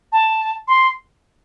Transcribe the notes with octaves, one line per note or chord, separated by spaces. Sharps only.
A5
C6